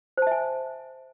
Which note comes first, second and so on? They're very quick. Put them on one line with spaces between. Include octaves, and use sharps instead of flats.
C5 A5 E5 G#5